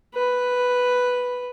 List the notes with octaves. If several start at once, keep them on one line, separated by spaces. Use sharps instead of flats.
B4